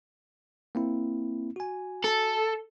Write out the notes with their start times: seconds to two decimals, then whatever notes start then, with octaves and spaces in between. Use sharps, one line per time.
0.75 A#3 C4 E4
1.56 F#4 G#5
2.04 A4